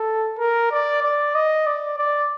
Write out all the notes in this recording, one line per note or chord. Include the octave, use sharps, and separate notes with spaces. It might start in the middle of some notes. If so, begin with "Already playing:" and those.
Already playing: A4
A#4
D5
D5
D#5
D5
D5